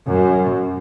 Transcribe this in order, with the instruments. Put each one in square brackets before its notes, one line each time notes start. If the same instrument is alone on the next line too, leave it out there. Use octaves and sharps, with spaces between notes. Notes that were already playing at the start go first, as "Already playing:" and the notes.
[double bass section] F#2